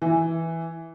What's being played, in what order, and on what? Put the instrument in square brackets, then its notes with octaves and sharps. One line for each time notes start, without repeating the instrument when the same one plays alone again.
[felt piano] E3